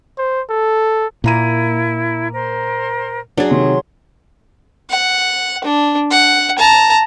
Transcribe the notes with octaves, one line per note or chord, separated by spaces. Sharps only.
C5
A4
A#2 A#3 E4 A#5 D#7
A#4 C5
F#3 D4 G#4
C3 D#3 C6
F#5
D4
F#5
A5 A#5